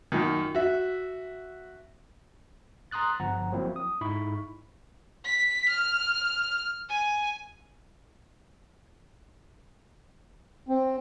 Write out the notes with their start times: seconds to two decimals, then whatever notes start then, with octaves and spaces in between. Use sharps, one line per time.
0.12 F#2 A#2 D#3
0.55 F#4 E5
2.91 A#5 C6 D#6 F#6 A6
3.20 G1 F3 F#5 A#5
3.52 F3 F#3 A#3 C4 E4
3.76 D#6
4.01 G#2 D#4 E4 B5 C#6
5.25 B6
5.69 F6
6.89 G#5
10.69 C4